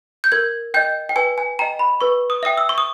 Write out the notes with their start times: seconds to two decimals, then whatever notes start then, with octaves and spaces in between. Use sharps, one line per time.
0.24 G6
0.32 A#4 G#6
0.74 D#5 G5 G6
1.09 G5
1.16 B4 G#5
1.38 G#5
1.59 D#5 G5 A#5
1.79 B5
2.01 B4 C#6
2.30 D#6
2.43 E5 G5 D#6
2.57 E6
2.69 C#6
2.78 D#6